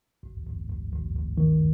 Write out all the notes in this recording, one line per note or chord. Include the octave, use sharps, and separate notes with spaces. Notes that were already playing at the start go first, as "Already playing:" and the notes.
G#1
G#1
G#1
G#1
G#1
D#3